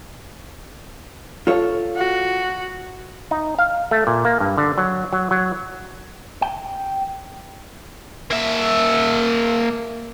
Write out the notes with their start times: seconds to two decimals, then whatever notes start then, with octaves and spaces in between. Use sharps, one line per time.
1.47 F4 A4 C#5
1.97 F#4
3.31 D#4
3.59 F5
3.91 A3
4.07 A#2
4.25 A#3
4.40 G2
4.58 D3
4.78 F#3
5.13 F#3
5.31 F#3
6.42 G5
8.31 A#3 E5